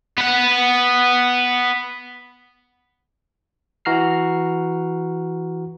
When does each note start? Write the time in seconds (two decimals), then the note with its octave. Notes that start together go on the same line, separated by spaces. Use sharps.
0.18 B3 F#5
3.85 E3 F#4 A#5 F6 C7